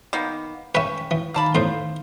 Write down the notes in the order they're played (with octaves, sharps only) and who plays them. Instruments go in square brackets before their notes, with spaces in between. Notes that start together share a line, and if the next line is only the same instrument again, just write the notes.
[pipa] D#3 A#3 B3
[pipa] C#4 [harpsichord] B4 E5 [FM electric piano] G5
[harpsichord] E3
[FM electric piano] D#3 F5 [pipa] A#3 A5 B5
[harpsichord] E2 A2 [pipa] C5